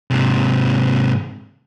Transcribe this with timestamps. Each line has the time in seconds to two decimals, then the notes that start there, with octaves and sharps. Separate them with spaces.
0.11 G#2 C3